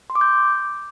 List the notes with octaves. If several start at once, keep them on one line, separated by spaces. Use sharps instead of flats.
C6
D6
G6